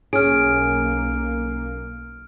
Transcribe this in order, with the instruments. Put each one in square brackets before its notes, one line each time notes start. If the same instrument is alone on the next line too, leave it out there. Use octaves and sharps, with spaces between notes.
[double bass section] B1 A#3 [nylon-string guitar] C#4 G#4 [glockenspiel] F6 D7